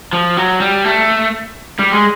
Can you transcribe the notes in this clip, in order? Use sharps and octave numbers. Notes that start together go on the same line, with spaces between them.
F3
F#3
G3
A3
G3
G#3